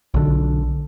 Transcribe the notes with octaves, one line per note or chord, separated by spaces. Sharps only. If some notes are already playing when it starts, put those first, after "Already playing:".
B1 D3